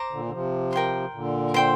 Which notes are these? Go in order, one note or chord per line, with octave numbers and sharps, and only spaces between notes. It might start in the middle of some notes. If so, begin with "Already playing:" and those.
Already playing: C5 A#5 D6
A#2 D3
D3
C3 F3
A#4 G5 C6
A#2 D3
C5 G5 C6